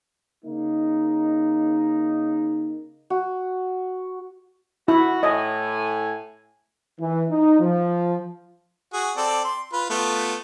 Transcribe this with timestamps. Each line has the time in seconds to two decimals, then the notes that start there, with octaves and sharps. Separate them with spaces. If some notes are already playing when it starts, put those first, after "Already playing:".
0.45 C#3 A#3 D#4
3.10 F#4
4.88 E4 F#4
5.23 A2 D#5 G#5
7.00 E3
7.30 D#4
7.60 F3
8.93 F#4 G#4
9.17 C4 A4 D5
9.45 C6
9.73 F4 B4
9.90 A3 B3 F4